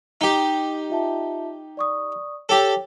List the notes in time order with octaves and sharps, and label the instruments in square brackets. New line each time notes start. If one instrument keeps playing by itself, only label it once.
[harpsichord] D#4 G4
[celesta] F4 E5 A5
D5 C#6 D#6
[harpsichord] G4 A4 [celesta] C#5 G5